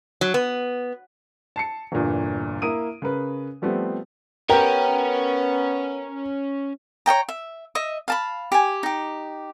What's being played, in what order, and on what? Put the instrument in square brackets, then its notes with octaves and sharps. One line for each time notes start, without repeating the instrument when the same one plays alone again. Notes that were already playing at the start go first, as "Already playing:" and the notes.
[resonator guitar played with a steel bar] F#3
B3
[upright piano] A5 C7 C#7
G1 E2 G2 A#2
A#3 E4 A#4 D#6 D7 D#7
C#3 A#4 B4
F3 G3 A3 B3 C4
[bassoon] B3 [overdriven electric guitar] C#4 C#5 [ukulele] G4 G5 [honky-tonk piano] A#4
[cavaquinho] C#5 D#5 G5 A#5
E5
D#5 E5
F5 A5 B5
G4 G#5
D#4 G4